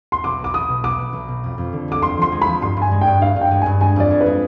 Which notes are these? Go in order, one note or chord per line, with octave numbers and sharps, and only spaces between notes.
C6
B1 D6
B3
D6
B1 D#6
B2
B3 D6
B3
B1
B2
F2
F2
D3
G#3 D6
F2 C6
F3 C6
G#3
B5
F3
G2 C6
G2 G#5
G#3
G5
G2
G2 F5
G2
G5
G#3
G2 G#5
G#3 G#5
F2 D5
G#3
G#3 B4